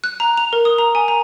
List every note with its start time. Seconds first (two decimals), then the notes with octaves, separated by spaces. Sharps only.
0.04 F#6
0.20 A#5
0.37 F7
0.53 A#4
0.65 D#6
0.78 A#5
0.95 G#5
1.08 A#5